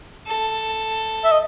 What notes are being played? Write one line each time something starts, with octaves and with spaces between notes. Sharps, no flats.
A4
E5
D#5